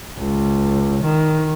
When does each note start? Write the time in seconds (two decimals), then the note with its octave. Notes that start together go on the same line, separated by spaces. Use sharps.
0.19 C#2
1.05 D#3